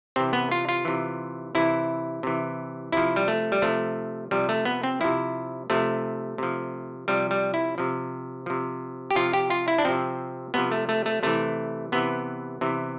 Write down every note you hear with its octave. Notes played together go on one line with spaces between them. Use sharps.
C3 E3 C4
B3
F4
F4
C3 E3
C3 E3 E4
C3 E3
C3 F3 E4
G3
A3
G3
C3 F3 A3
C3 F3 G3
A3
B3
C4
C3 F3 E4
C3 F3 A3
C3 F3
C3 F3 G3
G3
E4
C3 F3
C3 F3
G4
C3 F3 F4
G4
F4
E4
D4
C3 F3 C4
C3 F3 B3
A3
A3
A3
C3 E3 A3
C3 E3 B3
C3 E3